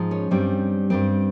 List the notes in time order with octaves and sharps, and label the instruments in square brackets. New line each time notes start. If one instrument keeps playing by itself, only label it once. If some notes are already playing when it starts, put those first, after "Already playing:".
Already playing: [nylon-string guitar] G#2 F3 G#3
C#4
G2 G3 C4
G2 G3 C4